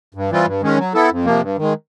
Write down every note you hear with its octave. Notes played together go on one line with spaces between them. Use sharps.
G2
E3 G3 C4 F4
G2
D#3 G#3 C#4
F#3
B3 E4 A4
F2
C3 F3 A#3
G2
D#3 G#3